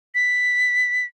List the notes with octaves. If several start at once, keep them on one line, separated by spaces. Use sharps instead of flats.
B6